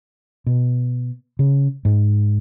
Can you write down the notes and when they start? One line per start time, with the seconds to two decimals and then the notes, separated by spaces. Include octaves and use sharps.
0.47 B2
1.39 C#3
1.85 G#2